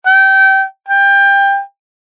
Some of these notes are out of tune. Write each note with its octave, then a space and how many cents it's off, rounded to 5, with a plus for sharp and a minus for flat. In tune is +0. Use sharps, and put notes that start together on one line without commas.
G5 -25
G5 +20